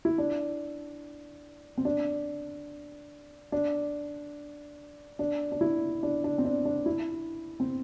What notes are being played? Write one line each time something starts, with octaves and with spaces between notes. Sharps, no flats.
E4
D4
C4
D4
D4
D4
D4
E4
D4
D4
C4
D4
D4
E4
C4